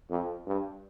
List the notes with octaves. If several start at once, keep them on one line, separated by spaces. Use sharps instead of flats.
F2
G2